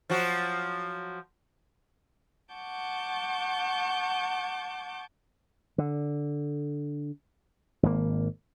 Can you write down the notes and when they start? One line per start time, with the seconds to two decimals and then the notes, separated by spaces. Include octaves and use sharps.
0.10 F3 F#3 F#4
2.52 F#5 A5 C#6 D6 G6
5.78 D3
7.83 G#1 A#3